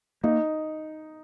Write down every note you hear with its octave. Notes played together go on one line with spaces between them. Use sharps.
A#3 D#4